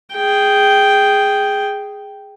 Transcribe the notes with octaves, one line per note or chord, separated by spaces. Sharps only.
G#4 G5